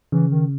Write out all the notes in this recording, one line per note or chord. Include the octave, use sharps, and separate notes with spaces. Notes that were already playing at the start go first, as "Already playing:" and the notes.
C#3 E3
D#3